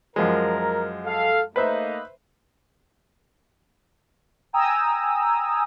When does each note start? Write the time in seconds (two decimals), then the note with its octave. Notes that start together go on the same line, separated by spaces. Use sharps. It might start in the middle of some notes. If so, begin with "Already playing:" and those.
0.16 F#2 F3 G#3 A#4
1.05 A4 F5
1.56 A3 A#3 D#4 B4 C5 E5
4.53 G5 G#5 A#5 D#6 E6